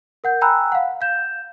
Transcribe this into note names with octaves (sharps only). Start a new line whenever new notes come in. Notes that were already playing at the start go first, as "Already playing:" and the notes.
A#4 F#5 G6
G5 G#5 A#5 B5 E6 F#6
F5 F#5
F5 G6 E7